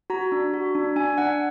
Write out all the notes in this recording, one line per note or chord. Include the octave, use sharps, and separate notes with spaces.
F#4 A#5
D4
F#4
D4
D4 G#5
D4 F#5